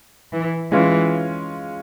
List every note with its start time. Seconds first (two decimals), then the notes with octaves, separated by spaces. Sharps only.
0.32 E3
0.72 E3 G#3 C#4 F4